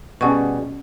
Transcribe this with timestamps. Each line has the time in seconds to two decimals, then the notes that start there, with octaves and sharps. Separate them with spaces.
0.21 B2 G3 C#4 G#4 F#5 C#6